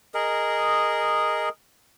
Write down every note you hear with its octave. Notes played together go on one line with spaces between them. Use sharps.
G#4 A#4 D#5